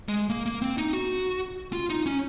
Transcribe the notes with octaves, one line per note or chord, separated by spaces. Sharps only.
G#3
A#3
A#3
C4
D#4
F#4
F4
D#4
C#4